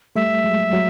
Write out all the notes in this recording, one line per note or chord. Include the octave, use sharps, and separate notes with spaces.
G3 A3 E5
F#3 G#3
F#3 G#3